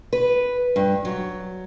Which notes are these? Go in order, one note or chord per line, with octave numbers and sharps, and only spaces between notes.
B4
G2
F#3